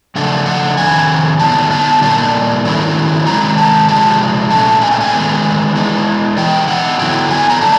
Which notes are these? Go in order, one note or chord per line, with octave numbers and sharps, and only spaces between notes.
C#3 F3 A3 D4 F#5
F#5
F2 C3 D#3 G#5
D3 F#3 B3 D#4 A5
A5
A#2 G3 A#3 D4 A5
D#3 F#3 A3 C#4 E4
C3 D#3 G#3 A#5
A5
C3 F3 G#3 A5
A#2 F3 A3 C#4 A5
G#5
G5
G#5
D#3 G#3 B3
E3 G#3 B3
E3 G#3 B3 D#4 G5
F#5
D3 F#3 B3 E4 G5
G#5
A#5
B2 F#3 A3 D4 A5